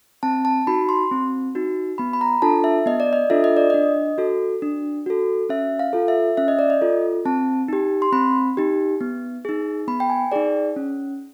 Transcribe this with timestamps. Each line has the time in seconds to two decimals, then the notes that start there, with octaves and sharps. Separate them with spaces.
0.23 C4 A5
0.45 A5
0.67 D#4 F#4 B5
0.89 C6
1.12 C4
1.55 D#4 F#4
1.98 B3 B5
2.13 B5
2.21 A#5
2.42 D4 F4 A4 A5
2.64 E5
2.86 B3 D#5
3.00 D5
3.13 D#5
3.30 D4 F4 A4 E5
3.44 D#5
3.57 D5
3.70 D4 D#5
4.18 F#4 A4
4.62 D4
5.06 F#4 A4
5.49 C#4 E5
5.79 F5
5.93 F4 A4
6.08 E5
6.37 C#4 E5
6.48 D#5
6.59 D5
6.70 D#5
6.81 F4 A4
7.25 C4 A5
7.68 D#4 G4
8.02 C6
8.12 C4 B5
8.57 D#4 G4
9.01 B3
9.45 D#4 G#4
9.88 B3 B5
10.00 G5
10.10 G#5
10.32 D#4 G#4 D5
10.76 C#4